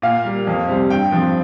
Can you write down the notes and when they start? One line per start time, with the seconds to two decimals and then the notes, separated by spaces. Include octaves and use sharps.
0.02 A#2 F5
0.24 G3 A#3
0.47 F2
0.68 C3 G3 C4
0.90 G2 G5
1.11 F3 C4